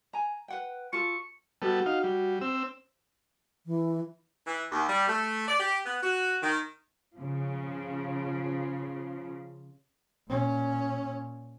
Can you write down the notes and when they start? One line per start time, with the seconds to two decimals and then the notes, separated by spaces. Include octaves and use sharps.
0.13 G#5 A#5
0.48 B4 F#5 G5
0.93 F4 A4 C#6
1.62 G3 B3 F#4 A4
1.86 D#4 F5
2.04 G3
2.41 C4 E6
2.56 C5
3.66 E3
4.46 E3
4.72 D#2
4.89 G3
5.07 A3
5.48 D5
5.60 G4
5.86 B3
6.03 F#4
6.43 D#3
7.15 C#3 F3
10.28 A#2 C#4